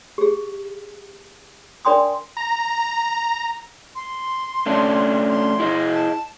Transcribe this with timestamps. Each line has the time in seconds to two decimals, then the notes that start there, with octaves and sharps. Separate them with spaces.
0.18 G4 G#4
1.85 D4 A#4 D5 G5 C6 D#6
2.37 A#5
3.95 C6
4.66 A3 C#4 D4
5.30 C6
5.60 E4 G#4 D#5
5.94 A5